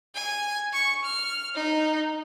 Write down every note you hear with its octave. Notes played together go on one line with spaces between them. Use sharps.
G#5
C#6
F6
D#4